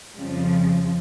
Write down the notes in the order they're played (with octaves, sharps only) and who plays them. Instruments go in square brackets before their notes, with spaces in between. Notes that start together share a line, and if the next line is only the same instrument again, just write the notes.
[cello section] F2 C#3 F3 G3